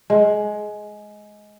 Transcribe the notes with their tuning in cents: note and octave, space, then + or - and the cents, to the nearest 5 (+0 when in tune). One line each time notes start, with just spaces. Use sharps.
G#3 +15